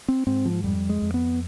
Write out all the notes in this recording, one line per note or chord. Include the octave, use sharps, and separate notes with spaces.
C4
G#2 C4
F3
F2 G3
G#3
F2
B3